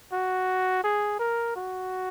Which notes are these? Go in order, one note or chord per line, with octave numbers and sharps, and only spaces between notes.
F#4
G#4
A#4
F#4